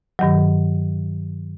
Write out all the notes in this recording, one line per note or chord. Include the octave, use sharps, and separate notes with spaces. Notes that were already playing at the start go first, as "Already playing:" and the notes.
G2 D#3 F#3